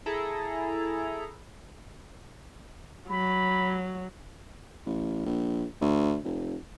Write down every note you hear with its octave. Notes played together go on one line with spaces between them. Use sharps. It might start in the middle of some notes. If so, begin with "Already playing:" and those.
E4 G#4 A4 A#5
F#3 B5
A1
A#1
D2
F1